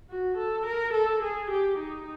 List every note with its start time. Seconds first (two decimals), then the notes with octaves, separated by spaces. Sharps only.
0.10 F#4
0.38 A4
0.66 A#4
0.94 A4
1.23 G#4
1.51 G4
1.79 D#4